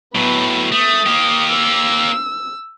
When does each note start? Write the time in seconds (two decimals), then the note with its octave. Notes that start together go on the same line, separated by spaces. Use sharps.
0.15 A2 F#3 B3 B5
0.72 A3 D#6
1.06 A#3 G4
1.51 E6